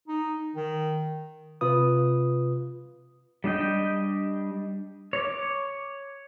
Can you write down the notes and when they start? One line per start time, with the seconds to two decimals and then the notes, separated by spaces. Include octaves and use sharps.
0.08 D#4
0.55 D#3
1.61 C3 F4 B4 D#6
3.44 G3 D4 D#5 G5
5.13 C#5 D6